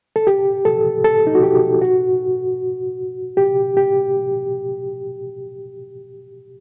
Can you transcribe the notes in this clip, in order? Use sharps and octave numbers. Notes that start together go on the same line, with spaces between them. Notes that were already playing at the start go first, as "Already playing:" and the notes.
A4
G4
A4
A4
D#4
F#4
G4
F#4
G4
G4